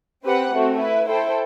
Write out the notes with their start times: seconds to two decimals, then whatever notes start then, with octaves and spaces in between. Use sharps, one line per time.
0.24 C4 G4 B4 F#5
0.53 A3 C4 F#4
0.80 E4 B4 E5
1.09 E4 A4 C5 G5